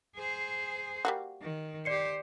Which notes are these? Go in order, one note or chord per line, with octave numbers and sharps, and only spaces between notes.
G#4 C5
G3 A#3 F#4
D#3
G4 C5 D5 C7 C#7